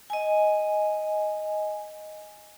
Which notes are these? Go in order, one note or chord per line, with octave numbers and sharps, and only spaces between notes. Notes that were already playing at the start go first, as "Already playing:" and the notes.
D#5 G#5